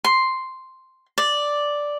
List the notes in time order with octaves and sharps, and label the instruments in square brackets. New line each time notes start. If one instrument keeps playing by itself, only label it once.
[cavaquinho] C6
D5